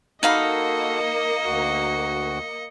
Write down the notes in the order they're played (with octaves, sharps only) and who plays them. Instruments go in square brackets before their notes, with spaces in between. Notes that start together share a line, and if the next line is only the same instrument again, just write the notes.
[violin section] A#3 [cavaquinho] D#4 F5 B5 [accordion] F#4 A4 [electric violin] D#5 C#7
[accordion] D2 F#4